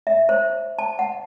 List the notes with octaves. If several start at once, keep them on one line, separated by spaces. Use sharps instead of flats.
E5
C5
A5
F#5